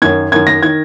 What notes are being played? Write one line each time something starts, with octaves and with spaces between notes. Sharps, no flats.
F#2 D#3 G#6
F#2 D#3 G#6
A#6
D#3 G#6